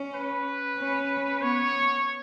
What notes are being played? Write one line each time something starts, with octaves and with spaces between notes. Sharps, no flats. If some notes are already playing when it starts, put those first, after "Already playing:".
Already playing: C#4
B4
C#4
B3 C#5